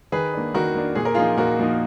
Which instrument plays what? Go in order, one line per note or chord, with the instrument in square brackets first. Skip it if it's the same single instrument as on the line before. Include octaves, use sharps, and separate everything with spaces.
[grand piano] D#3 [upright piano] G#4 B4
[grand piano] A#3 D4
[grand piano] D#3 [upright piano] F#4 A#4
[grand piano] A#3 D4
[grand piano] A#2 [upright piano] G#4
[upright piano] A#4
[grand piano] F3 A#3 D#4 [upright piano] F4 G#4
[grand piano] A#2 [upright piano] F#4 A#4
[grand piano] F3 A#3 D#4